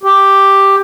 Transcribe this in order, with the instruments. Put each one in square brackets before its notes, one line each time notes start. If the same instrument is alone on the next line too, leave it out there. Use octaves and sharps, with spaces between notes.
[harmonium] G4